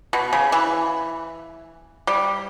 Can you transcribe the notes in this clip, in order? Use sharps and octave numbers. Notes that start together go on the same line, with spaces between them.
B2
C#3
E3
G3